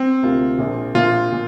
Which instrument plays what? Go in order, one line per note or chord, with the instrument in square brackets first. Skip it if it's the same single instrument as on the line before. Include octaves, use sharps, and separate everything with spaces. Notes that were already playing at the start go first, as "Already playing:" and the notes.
Already playing: [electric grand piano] C4
[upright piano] D2 C3 A#3 F4
A#1 A#2 A#3
[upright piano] A#1 A#2 A#3 [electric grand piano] F4
[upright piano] A#2